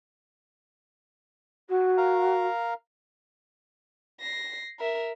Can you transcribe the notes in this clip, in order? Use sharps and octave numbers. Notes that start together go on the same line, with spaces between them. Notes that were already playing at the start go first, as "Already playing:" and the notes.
F#4
A#4 F5 A#5
A#6 C7
A#4 E5